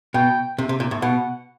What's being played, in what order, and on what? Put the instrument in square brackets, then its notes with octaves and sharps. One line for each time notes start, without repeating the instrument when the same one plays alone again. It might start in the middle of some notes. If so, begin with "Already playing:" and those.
[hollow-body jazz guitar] B2 [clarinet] G5
[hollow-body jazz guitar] C3
C3
A#2
A2
[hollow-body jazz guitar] B2 [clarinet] F#5